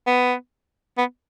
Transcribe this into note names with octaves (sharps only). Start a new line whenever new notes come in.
B3
B3